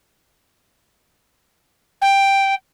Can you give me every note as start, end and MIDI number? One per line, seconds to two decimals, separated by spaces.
2.02 2.55 79